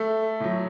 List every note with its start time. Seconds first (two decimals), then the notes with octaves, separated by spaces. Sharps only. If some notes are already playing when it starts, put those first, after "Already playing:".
Already playing: A3 A4
0.40 A2 F#3